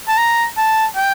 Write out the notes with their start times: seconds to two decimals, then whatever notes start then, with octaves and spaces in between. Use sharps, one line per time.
0.08 A5
0.18 A#5
0.58 A5
0.96 G5